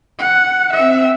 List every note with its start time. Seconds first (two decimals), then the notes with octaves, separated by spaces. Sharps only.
0.19 F#5
0.74 C4 E5